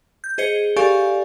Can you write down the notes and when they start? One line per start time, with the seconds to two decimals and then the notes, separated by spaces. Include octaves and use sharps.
0.24 G6
0.38 G#4 C5 D#5 C#7 G7
0.76 G4 A4 D5 F5 G#5 C#6